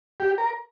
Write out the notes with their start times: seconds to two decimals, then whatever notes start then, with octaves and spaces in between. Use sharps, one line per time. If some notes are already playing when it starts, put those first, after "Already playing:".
0.20 G4
0.38 A#4